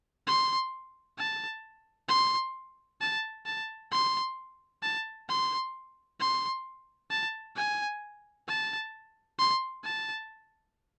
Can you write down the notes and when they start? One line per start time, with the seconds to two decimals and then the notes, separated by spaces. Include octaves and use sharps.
0.27 C6
1.18 A5
2.09 C6
3.01 A5
3.46 A5
3.92 C6
4.83 A5
5.29 C6
6.20 C6
7.11 A5
7.56 G#5
8.48 A5
9.39 C6
9.84 A5